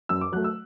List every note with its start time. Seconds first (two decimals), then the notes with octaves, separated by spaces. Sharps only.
0.09 F#2 E6
0.21 D6
0.32 F#3 A3 F#6
0.44 E6